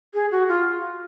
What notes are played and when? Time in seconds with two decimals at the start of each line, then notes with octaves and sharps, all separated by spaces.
0.14 G#4
0.31 F#4
0.48 F4